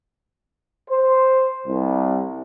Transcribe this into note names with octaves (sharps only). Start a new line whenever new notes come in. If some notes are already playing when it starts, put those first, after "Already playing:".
C5
C2